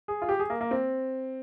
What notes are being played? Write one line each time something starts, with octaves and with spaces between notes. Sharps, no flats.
G#4
F4
G4
G#4
A#3
A#3
C4